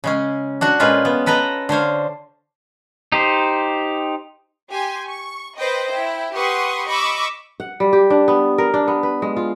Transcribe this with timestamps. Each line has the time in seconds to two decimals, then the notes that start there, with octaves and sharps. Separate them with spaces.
0.04 C#3 G#3 C#4
0.61 D4 F#4 F#5
0.80 A#2 G#3 C#4 F4 B4
1.05 B3
1.26 A4 B4 D#5 A#5
1.69 D3 C5 C#5 F5
3.12 D#4 G4 C5
4.69 G4 G#5 C6
5.06 C#6
5.57 B4 C5 D#5 G5
5.89 E4 G5
6.34 G4 B4 F#5 C6 C#6 D#6
6.87 D#5 B5 C#6 D6 E6
7.60 F#5
7.80 G3
7.93 G4
8.10 D4
8.28 B3
8.58 A#4
8.74 D4
8.88 B3
9.03 B4
9.22 G#3
9.37 F4